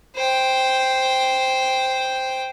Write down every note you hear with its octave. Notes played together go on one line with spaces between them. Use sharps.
C5 G5